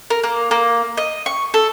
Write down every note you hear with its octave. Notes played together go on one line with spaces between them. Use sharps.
A#4
A#3
A#3
D#5
C#6
A4